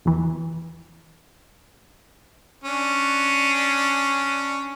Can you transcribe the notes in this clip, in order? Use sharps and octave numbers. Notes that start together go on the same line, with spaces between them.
E2 E3
C#4 D4